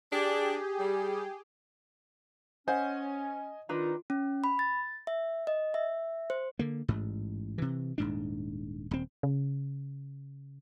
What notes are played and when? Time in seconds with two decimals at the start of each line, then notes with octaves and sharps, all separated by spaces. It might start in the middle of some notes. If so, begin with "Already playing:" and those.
0.12 D4 G4 G#4
0.79 G3
2.68 C#4 C5 D#5 F#5 G#5
3.69 D#3 D4 D#4 F4 B4 A#5
4.10 C#4
4.44 B5
4.59 A6
5.07 E5
5.47 D#5
5.74 E5
6.30 C5
6.59 D3 A#3
6.88 A1 G#2
7.58 C3 E3
7.98 D#1 G#2 D4
8.91 D#1 C4
9.23 C#3